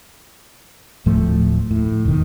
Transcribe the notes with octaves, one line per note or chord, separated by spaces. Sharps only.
D1 A2 F3 A3
A2
E1 D#3